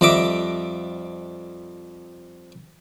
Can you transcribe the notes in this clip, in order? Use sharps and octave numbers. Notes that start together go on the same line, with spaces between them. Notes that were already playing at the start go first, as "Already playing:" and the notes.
F2 G3 D#5 E5 D6